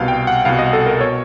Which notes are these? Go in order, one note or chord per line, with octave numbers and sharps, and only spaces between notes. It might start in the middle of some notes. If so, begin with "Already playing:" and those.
Already playing: C2 B2 F5
G5
F#5
C2 B2 F5
D#5
A4
A#4
B2 C#5